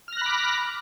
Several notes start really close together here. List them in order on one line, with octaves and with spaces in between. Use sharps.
F6 A#6 F#6 B5 D6